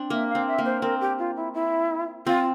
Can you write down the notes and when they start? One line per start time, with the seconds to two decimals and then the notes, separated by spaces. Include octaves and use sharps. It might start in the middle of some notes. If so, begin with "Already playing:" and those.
Already playing: C4 D4
0.10 A#3 E5
0.29 F5
0.35 C4
0.47 E5
0.58 A#3
0.65 C5
0.82 C4 A#4
1.01 G4
1.19 F4
1.36 E4
1.54 E4
2.26 C4 F4